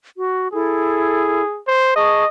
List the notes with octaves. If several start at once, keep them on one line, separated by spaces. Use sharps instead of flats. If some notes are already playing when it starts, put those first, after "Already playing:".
F#4
E4 G#4 A4
C5
G#4 D#5 A5 C#6